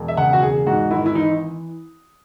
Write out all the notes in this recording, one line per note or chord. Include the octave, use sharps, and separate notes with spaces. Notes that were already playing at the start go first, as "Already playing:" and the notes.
Already playing: E1
E5
C#3 F#5
F#4
E1 G#4
G#2 F#4
G#1 E4
E4
E3 D#4